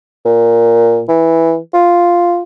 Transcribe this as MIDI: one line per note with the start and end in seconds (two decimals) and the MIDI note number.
0.25 1.03 46
1.08 1.57 52
1.74 2.42 65